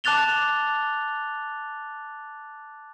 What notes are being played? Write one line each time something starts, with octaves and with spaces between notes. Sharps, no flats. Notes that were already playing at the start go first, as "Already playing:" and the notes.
A5 D6 F#6 A6 F7 G7